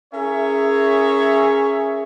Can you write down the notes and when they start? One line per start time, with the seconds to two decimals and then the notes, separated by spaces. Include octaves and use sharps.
0.13 C#4 E4 G#4 A#4 C#5 E5